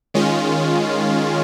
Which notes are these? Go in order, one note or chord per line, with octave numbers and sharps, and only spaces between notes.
D#3 G#3 C#4 F4